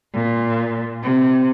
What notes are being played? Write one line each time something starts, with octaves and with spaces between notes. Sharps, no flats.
A#2
C3